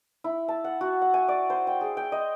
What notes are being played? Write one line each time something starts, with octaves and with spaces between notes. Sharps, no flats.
E4
A5
F#5
F#4
F#5
G#5
D5
C5
G5
G#4
G5
D#5